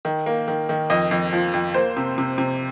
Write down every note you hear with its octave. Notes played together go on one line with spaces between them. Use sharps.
D#3
A#3
D#3
D#3
F2 D#5
F2
F3
F2
A#3 C5
C3
C3
C3